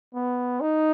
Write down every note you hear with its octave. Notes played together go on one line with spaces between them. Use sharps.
B3
D#4